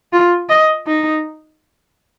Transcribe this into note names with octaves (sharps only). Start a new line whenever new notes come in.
F4
D#5
D#4